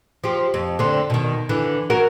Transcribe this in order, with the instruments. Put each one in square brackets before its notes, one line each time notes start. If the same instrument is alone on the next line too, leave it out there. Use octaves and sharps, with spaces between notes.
[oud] F3 G4
F2
D3 C4
B2 D#3
D3 E3
F#3 F#4 A#4